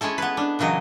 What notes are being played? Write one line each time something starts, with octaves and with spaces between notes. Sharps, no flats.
G#3 C#4 E4 A4
B3 B4
D4
A#2 C#3 E3 F#3 D#5